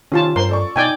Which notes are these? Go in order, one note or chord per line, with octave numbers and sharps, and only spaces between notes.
C3 D#3 C#4 F4 A5
G2 A#4 C5 C6
A4 D5 C#6
B2 D#4 D5 G5 G#5